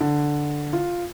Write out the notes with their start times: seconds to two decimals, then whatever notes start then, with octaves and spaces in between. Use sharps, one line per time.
0.01 D3
0.73 F4